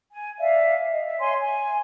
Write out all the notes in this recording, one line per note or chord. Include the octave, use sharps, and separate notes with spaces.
G#5
D5 E5 F5
D#5
E5
C#5 G#5 C6
G#5